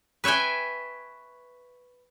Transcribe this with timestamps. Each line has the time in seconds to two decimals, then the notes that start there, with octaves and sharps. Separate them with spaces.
0.24 B4 C#5 E5 G5 G#5